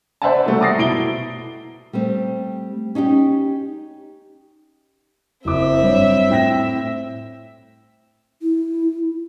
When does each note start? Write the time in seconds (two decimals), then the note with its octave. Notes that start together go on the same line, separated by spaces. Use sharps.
0.22 C5 D5 E5 F#5 G#5 A5
0.46 C3 F#3 G3 A3 F#4
0.60 A#5 D6 D#6 A6 A#6 C7
0.78 B2 E4 D7 G7
1.93 G3 A3 C4
2.95 C#4 D#4 F#4 G4
5.45 F#1 C4 E4 E5 D6
5.83 G2 C#5
6.30 A2 G5 A#6
8.42 E4